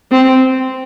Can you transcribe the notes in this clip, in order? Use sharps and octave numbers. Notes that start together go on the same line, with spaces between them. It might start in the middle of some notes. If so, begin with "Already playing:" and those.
C4